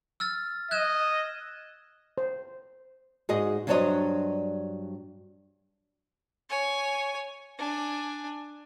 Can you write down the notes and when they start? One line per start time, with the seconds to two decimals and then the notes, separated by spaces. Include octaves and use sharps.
0.20 E6 F6 A6
0.71 D#5 F#6 G#6 E7
2.18 C5
3.29 G#2 F#4 G#4 D#5
3.67 G2 F#3 D4 C5 C#5 D#5
6.49 C#5 G#5
7.58 D4 G#5